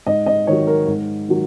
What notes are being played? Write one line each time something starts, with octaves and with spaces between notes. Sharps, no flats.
G#2 D#5
D#5
D#3 F#3 C#5
A#4
G#2
D#3 F#3